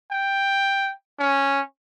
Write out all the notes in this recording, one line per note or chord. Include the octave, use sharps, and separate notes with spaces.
G5
C#4